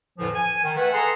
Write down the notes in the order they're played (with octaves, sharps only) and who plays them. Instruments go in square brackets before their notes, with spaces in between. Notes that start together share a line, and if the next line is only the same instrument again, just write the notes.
[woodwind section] F2 A2 D3 E3 F3
G#5
D#3
A3 B4 F#5
G#4 A4 G#5 A#5 C6